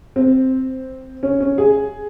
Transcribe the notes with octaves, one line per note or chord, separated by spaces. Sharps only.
C4
C#4
C#4
G#4